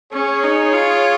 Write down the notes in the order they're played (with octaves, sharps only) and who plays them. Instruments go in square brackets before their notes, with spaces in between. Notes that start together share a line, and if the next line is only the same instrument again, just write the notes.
[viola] C#4 [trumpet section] G#4 C#5
[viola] D#4
F4